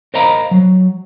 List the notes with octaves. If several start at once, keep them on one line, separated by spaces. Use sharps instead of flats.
A#4 C5 D#5 F5 A#5 B5
F#3